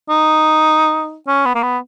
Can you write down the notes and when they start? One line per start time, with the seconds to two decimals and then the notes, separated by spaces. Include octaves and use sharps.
0.10 D#4
1.28 C#4
1.46 B3
1.55 A#3
1.63 B3